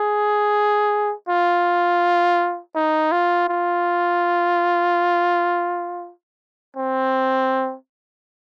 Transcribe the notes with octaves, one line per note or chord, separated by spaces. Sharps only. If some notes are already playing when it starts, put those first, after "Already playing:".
Already playing: G#4
F4
D#4
F4
F4
C4